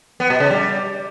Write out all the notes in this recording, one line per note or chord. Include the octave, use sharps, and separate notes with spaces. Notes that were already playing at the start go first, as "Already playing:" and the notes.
B3
B2
C#3
G3